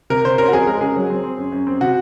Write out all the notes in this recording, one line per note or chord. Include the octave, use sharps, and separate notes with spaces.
C3 A#4
C3 C5
C#4 A#4
F#4
F2 G#4
G#3 A#4
C#3 G#4
F#3
C4
C4
F#2
F#2
C4
C3 F#4